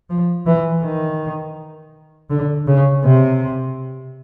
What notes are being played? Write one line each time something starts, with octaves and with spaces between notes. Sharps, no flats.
F3
E3
D#3
D3
C#3
C3